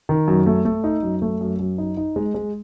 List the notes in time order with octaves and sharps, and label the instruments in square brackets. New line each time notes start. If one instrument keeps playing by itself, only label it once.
[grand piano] D#3
F#2
A3
A3
D#4
F#2
A3
F#2
F#2
D#4
D#4
G#3
G#3